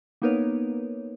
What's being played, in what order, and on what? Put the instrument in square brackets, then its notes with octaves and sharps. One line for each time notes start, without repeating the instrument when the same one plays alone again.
[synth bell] A#3 B3 D#4 A#4 B4 C#5